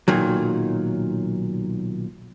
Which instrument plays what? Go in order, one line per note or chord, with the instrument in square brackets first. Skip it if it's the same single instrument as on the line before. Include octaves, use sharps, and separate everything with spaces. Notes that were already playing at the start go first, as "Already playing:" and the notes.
[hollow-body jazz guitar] B1 A#2 D#3 F#3